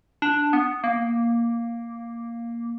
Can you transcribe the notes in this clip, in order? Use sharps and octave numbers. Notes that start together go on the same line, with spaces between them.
D4
B3
A#3